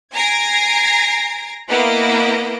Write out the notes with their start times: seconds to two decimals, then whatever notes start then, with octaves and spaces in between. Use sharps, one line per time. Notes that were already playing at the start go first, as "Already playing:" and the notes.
0.13 G#5 A#5 G#6 A#6 C7 D7
1.69 A#3 B3 E4 B4 D#5 D7